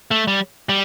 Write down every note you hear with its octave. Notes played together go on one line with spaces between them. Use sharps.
A3
G3
G3